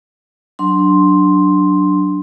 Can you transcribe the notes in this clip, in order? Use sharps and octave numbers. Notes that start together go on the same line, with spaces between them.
F#3 D4 C6